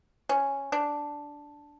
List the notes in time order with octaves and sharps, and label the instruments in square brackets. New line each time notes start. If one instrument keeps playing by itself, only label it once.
[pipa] C#4
D4